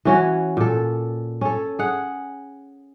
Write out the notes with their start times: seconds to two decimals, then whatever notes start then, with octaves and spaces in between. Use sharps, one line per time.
0.05 E3 C#4 F#4
0.57 A#2 A4
1.41 C#4 A4
1.79 G#4 F#5